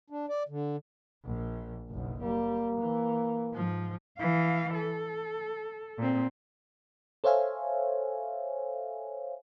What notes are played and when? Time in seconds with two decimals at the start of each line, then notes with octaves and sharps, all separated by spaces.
0.10 D4
0.29 D5
0.49 D3
1.25 A#1 A#2
1.90 F#1 B1
2.22 G3 A#3
2.79 E3
3.51 G#2 F3
4.18 E3 F5
4.74 A4
5.98 A#2 C4
7.24 A4 C5 C#5 E5 F5 G#5